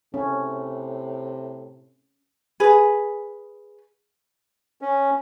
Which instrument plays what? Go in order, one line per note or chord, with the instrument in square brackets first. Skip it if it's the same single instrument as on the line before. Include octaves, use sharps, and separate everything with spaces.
[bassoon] A2 [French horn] C3 [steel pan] C#4
[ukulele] G#4 B4
[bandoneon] C#4